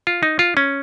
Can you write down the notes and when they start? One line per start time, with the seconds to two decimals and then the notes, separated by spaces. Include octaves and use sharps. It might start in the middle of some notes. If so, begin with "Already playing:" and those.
0.07 F4
0.23 D#4
0.39 F4
0.57 C#4